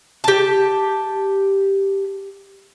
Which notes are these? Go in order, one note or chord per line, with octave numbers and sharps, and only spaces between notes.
G4 A5